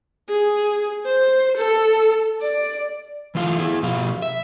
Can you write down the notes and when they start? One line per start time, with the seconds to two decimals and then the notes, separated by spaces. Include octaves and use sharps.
0.29 G#4
1.06 C5
1.57 A4
2.42 D5
3.35 E3 A3 F4 F5
3.59 E4 G#4
3.83 B2 F3 F5
4.22 E5